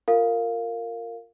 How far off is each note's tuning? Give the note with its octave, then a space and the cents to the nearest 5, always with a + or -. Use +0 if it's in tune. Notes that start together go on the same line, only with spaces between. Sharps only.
F4 +0 A#4 -20 F5 +0